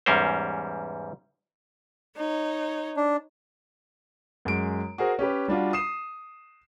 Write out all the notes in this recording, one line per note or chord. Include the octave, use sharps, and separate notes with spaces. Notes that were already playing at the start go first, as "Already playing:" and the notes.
E2 G#2 G3 C#4 A#4 C5
D#4 C#5
D4
F#2 G#3 D7
F#4 G#4 A#4 C5
C#4 G4 B4
G3 D4 F4 F#4
D#6 C7 E7